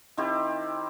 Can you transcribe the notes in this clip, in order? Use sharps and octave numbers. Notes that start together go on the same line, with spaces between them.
D#3 C4 E4 G4